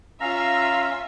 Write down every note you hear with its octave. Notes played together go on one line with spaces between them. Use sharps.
C#4 F4 E5 F5 A#5